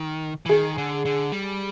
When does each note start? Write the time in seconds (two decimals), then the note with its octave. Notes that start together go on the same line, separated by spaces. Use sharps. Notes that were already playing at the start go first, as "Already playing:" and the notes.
Already playing: D#3
0.46 E3
0.49 D#3 G#4
0.78 D3
1.05 D3
1.32 G3